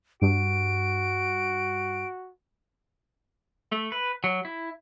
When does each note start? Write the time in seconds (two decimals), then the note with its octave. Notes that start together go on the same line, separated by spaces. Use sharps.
0.22 G2 F#4 D7
3.72 A3
3.92 B4
4.24 F#3
4.45 E4